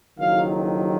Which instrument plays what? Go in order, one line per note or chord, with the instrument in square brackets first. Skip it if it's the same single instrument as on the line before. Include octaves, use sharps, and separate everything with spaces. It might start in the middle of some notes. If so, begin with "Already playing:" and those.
[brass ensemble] F#1 F2 D#3 F#3 F5